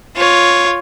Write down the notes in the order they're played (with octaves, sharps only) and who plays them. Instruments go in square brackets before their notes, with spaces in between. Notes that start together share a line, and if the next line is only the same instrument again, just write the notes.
[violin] F4 C#5